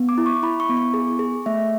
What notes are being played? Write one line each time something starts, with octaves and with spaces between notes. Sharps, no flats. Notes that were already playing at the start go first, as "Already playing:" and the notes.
Already playing: B3
D6
E4
C#6
E4 B5
C#6
B3
C#6
G#4
G#4
A3 E5